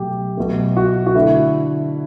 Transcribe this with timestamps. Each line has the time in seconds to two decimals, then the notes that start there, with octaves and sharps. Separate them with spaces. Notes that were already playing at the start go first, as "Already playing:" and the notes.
Already playing: B2 F#3 A3 G4
0.37 B2 F#3 A3
0.77 F#4
1.07 F#4
1.15 D3 A3 E4